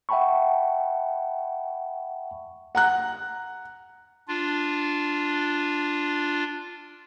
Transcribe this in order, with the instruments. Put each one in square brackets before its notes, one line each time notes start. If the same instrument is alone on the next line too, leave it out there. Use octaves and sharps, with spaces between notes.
[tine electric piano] E5 F#5 G5 A5 B5 C#6
[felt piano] F#5 A#5 F#6
[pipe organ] D4 F4